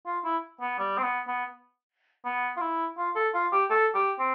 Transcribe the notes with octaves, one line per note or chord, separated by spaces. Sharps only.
F4
E4
B3
G3
C4
B3
B3
B3
F4
E4
F4
A4
F4
G4
A4
G4
C4